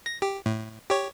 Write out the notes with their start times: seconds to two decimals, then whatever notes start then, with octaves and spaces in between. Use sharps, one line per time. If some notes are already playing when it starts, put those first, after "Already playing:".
0.06 A#6
0.22 G4
0.46 A2
0.90 G4 C#5